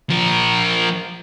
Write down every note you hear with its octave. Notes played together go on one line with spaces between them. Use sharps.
F3 A#4